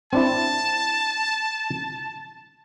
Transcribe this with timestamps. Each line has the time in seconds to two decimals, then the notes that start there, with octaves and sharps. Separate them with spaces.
0.13 C4 D4 E4 A5